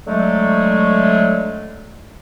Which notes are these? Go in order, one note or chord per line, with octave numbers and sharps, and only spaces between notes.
D3 F#3 G#3 A3